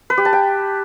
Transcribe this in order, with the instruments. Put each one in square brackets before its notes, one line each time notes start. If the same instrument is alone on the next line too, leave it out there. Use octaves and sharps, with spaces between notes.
[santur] B4
G4
A5
G5